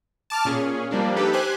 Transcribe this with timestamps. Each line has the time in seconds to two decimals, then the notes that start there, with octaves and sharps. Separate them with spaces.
0.30 A5 D6 F6
0.45 A#2 C#4 G#4
0.91 F3 G3 A#3 D4
1.16 D#4 G4 A4 B4
1.33 G4 C5 G#5 F#6